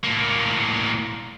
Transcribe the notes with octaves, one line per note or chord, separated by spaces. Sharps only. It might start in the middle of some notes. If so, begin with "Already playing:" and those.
A2 A#3